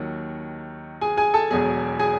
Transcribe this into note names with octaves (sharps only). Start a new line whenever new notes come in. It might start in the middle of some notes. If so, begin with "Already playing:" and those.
Already playing: D#2 D#3 F#3
G#4 G#5
G#4 G#5
A4 A5
E1 E2 B2 F#3 G#4 G#5
G#4 G#5